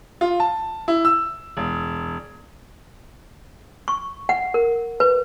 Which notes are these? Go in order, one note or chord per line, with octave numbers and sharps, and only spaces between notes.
F4
A5
E4
E6
E1
C#6
F#5
A#4
B4